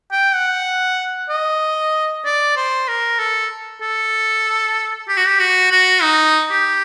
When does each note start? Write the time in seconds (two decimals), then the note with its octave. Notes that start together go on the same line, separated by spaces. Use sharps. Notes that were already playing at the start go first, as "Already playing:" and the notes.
0.12 G5
0.35 F#5
1.29 D#5
2.25 D5
2.57 C5
2.88 A#4
3.19 A4
3.82 A4
5.09 G4
5.17 F#4
5.27 G4
5.40 F#4
5.71 F#4
6.03 D#4
6.51 G4